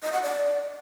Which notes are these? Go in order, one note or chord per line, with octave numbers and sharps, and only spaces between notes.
D#5
F#5
D5